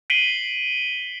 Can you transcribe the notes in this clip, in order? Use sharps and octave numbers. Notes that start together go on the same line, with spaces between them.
B6 C7 D7 D#7 F#7 G7